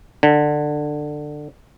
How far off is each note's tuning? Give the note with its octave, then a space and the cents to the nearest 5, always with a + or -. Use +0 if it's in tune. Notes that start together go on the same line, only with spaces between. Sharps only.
D3 +20